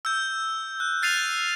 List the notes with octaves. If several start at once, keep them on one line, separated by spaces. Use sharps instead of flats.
E6 G6
F#6
F6 A6 C7 D#7 F7